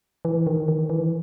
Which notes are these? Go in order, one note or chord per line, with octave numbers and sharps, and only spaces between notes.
E3
D#3
D#3
E3